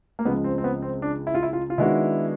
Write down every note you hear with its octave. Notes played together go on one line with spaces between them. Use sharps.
A#3
C#2 C#3 F3 G#3 B3
C4
C4
B3
C4
D4
E4
F4
E4
F4
F4
D#3 G#3 B3 D4 E4 F#4